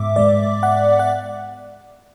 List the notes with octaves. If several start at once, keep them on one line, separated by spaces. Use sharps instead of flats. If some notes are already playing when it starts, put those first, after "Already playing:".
Already playing: G#2 G#3 B3 E5 D6
G#2 G#3 B3 D5
F#5
F#5